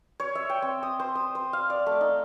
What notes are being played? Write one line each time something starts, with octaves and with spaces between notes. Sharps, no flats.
C#5
E5
G5
C4
D#6
C5
D#6
C5
F5
D5
A3
D#4